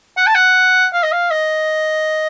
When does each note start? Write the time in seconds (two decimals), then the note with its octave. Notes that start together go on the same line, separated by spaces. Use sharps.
0.17 F#5
0.26 A5
0.35 F#5
0.93 F5
1.03 D#5
1.12 F5
1.31 D#5